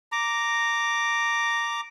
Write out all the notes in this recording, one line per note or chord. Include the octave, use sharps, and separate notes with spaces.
A#5 D6